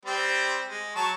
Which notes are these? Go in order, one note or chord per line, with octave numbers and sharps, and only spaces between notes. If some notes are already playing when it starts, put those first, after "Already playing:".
G3 C4 C5
G#3
F#3 A5 C#6